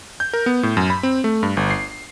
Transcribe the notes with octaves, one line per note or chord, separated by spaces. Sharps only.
G6
A#4
B3
A2
F#2
B5
C4
A3
G2
G1
C7